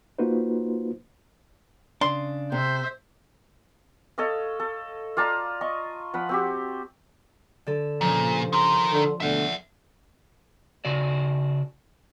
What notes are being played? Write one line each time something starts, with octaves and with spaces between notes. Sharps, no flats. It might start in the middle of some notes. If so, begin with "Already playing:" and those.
A#3 D#4 F4 F#4 B4 C5
C#3 D4 C6
C3 C5 E5
A4 C#5 D#5 F5
A4
F4 D5 A5 A#5
D#5 C#6
F3 F#5 B5
C4 F#4 G4
D3 A4
G2 A#2 C#3 F3 C#4
D#3 A#4 C6
D3 A4
B2 D3 A3 E5 F#5
C#3 F#4 D5